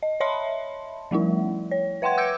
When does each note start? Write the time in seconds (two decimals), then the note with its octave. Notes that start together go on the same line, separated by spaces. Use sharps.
0.02 D#5
0.20 C#5 D#5 E5 A5 B5 C6
1.11 F3 G3 A3 E4
1.71 C#5
2.02 B4 E5 F#5 G5 C6 G#6
2.17 D6 E6 G6 G#6 C#7 D7